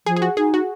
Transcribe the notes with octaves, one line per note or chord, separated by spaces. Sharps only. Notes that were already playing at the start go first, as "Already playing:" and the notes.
F3 G#4
G#4
F#4
D#4 G#4
F#4